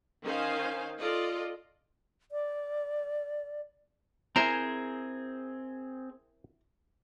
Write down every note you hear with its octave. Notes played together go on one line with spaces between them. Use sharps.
D#3 C#4 D#4 C5 F5 G#5
F4 A4 D5 D#5
D5
C4 E4 G#4 A#4 C5 G#5 A#5